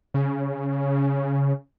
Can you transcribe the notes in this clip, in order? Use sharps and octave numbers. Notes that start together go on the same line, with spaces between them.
C#3